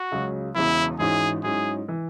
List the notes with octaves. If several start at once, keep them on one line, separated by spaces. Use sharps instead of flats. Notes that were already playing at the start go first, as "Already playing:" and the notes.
Already playing: F#4
C#2 C#3 F#3
E1 E2 C#3 E3 E4
G#1 G#2 E3 C#4 E4 G#4
G#2 F#3 C#4 E4 G#4
E3